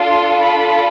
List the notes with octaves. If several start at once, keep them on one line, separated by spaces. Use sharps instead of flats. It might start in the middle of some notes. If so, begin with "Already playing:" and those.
Already playing: D4 F4 A4 C6
B5